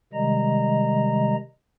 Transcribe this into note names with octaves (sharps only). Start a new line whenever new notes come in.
C3 D#3 G3 G#3 D#5 A#5